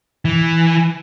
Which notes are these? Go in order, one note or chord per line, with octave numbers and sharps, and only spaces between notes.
E3